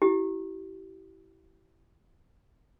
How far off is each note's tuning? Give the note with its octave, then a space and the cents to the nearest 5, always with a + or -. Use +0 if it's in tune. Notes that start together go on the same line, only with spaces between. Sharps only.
E4 +0 G4 -35